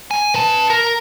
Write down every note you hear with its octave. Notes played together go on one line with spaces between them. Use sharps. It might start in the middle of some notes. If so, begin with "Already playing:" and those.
G#5
B4 A5
A#4